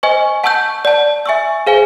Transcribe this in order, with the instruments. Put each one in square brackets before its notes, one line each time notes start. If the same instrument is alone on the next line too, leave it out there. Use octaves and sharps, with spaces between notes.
[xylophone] C5 D#5 G#5 C#6
F#5 A5 C#6 E6 G6
D5 F#5 A5
E5 G#5 C#6 E6
G#4 C5 F5 G#5